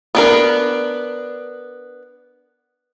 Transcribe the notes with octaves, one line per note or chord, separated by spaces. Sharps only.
B3 D4 A#4